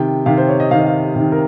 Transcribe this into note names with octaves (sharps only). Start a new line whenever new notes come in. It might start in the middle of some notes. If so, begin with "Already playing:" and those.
Already playing: C3 D#3 G5
C3 D#3 F5
C5
C#5
D#5
C3 D#3 F5
D#5
F5
C3 D#3
A#4